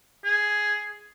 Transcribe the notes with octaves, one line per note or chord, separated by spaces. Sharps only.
G#4